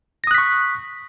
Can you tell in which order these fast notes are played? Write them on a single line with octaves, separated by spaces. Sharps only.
A#6 D#6 F#6 B6 C#6